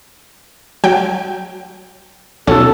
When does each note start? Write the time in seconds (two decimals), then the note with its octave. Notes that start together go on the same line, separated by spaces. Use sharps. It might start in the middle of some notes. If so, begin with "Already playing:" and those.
0.84 F#3 G5
2.47 B1 C#4 F4 A4